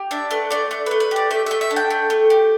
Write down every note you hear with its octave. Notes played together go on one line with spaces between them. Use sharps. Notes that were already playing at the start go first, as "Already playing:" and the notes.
Already playing: G4
D4 E5
A3 B4
A3 D5
A3 D5
A3 B4
B4
G4 D5
A3 E5
A3 E5
E5
D4
G5
A3
A3
G4